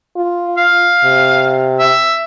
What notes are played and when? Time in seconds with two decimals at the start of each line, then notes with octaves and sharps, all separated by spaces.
0.16 F4
0.57 F5
1.04 C3
1.79 E5